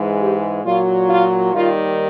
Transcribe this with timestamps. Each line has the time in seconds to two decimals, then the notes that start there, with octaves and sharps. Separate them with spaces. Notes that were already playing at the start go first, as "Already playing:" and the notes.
Already playing: G#2 E3 G#3
0.20 G4
0.64 A#2 F#3 F4
1.09 F4
1.53 D#2 D#3 G3 F4